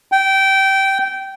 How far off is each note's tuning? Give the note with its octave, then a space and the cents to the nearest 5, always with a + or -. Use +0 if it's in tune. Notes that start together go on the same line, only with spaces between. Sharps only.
G5 -20